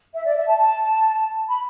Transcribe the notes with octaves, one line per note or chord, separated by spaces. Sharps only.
E5
D5
E5
A5
A5
B5